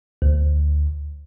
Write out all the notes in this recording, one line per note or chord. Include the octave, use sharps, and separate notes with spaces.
D2